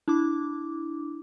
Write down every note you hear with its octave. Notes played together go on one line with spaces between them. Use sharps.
D4 E4 D6